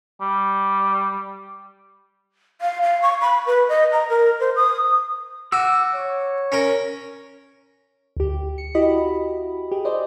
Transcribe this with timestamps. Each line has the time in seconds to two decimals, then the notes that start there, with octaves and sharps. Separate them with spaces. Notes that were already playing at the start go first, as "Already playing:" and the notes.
0.21 G3
2.61 F5
2.82 F5
3.02 C#6
3.21 B5
3.46 B4
3.69 D#5
3.92 A#5
4.09 A#4
4.40 C5
4.56 D#6
5.52 F#4 D6 E6
5.94 C#5
6.52 C#4 A#4
8.17 D2 G4
8.58 C#7
8.75 E4 F#4 G4 D#5 B5
9.72 G4 G#4
9.85 G#4 C5 D5 D#5